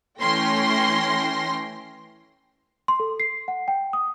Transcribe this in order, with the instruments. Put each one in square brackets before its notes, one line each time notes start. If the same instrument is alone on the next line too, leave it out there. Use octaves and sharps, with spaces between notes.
[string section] E3 A3 C#4 G5 C6 A#6
[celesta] C6
A4
C7
F#5
G5
D#6